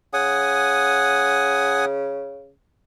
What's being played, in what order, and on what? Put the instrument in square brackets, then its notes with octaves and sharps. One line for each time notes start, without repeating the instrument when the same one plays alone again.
[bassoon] C#3 [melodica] F#5 G#5 D#6